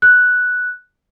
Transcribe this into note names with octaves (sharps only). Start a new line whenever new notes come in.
F#6